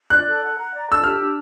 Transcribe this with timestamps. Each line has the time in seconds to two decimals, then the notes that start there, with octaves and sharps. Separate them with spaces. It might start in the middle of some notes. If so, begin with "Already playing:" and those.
0.10 D5 F#6
0.26 A4
0.42 F#5
0.57 A#5
0.73 D5
0.88 A4 E6
1.04 G4 F6
1.20 D4